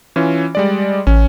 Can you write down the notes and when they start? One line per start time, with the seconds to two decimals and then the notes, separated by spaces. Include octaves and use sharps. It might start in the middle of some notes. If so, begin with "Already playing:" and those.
0.16 E3 C#4 F4
0.55 G3 G#3 D5
1.07 A1 C#4